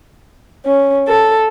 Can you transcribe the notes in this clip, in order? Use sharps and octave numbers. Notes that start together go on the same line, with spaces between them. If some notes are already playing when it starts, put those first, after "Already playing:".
C#4
A4